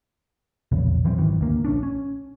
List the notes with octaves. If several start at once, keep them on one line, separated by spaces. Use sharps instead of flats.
E1 A#1 E2 C#3
A#2 E3 F#3 C4
G#1 F#2 D#3 E3
D2 A#3
A#1 C#4 D4
C#4